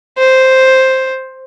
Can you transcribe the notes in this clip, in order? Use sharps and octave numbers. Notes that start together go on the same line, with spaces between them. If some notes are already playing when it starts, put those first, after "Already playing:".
C5